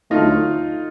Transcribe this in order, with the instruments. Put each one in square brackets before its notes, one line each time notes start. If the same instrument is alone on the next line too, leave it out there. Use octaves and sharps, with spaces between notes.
[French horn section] D2 D3 F#3 A3 [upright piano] D#4 F4